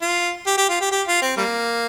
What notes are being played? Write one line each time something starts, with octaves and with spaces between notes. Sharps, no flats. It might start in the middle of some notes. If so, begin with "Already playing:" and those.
F4
G4
G4
F4
G4
G4
F4
C4
G3 A#3